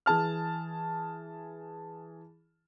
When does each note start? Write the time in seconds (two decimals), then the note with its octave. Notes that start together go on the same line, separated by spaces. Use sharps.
0.06 E3 G#4 A5 F6